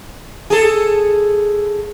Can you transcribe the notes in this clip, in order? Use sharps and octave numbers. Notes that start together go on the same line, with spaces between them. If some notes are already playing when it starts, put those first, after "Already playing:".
G#4 A4